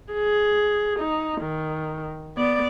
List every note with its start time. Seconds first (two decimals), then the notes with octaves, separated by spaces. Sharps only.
0.13 G#4
0.99 D#4
1.41 D#3
2.37 B3 D5